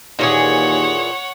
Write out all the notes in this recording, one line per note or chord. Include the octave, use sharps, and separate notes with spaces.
D#2 A#2 E3 G#4 C#5 F#5